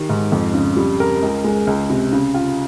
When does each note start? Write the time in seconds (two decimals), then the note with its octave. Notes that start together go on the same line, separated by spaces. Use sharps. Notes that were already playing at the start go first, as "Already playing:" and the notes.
Already playing: D#3 G4
0.09 G#2
0.32 F2
0.54 C#3
0.77 G3
1.00 A#4
1.22 C#2
1.44 G#3
1.67 C#2
1.90 C3
2.13 C#3
2.34 F4